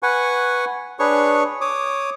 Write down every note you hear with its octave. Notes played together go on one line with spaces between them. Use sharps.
B4 F#5 G#5 C#6
D4 G#4 B4 C#5 C#6
C#5 D6 D#6